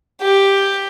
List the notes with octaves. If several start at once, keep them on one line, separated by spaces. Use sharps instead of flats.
G4